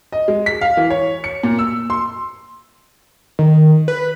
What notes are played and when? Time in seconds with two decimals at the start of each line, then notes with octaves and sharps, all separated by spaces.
0.12 D#5
0.28 G#3
0.46 B6
0.61 F5
0.77 E3
0.90 C#5
1.24 C#7
1.43 A#2
1.59 E6
1.90 C6
3.39 D#3
3.88 B4